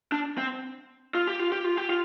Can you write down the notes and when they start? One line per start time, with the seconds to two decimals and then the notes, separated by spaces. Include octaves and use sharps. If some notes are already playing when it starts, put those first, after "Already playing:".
0.12 D4
0.38 C4
1.15 F4
1.27 G4
1.39 F4
1.52 G4
1.64 F4
1.77 G4
1.90 F4